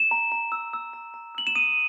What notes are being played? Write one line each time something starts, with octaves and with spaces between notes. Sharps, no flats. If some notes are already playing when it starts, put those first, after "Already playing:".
Already playing: E7
A#5
A#5
E6
E6
A#5
A#5
E6 F#7
E7
D#6 D#7